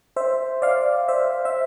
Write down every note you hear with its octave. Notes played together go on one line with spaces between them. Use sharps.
C5 E5
D5 F5
C5 E5
E5